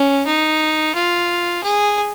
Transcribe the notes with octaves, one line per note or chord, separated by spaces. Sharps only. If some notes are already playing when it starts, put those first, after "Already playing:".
Already playing: C#4
D#4
F4
G#4